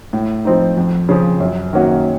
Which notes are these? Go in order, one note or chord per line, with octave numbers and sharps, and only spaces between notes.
A2
F3 C4 D#4
F2
C#3 F3
F#2
D#3 A#3 C#4 F#4